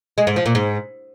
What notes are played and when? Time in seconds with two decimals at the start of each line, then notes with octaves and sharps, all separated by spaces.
0.18 G#3
0.27 G#2
0.36 F3
0.46 A#2
0.55 G#2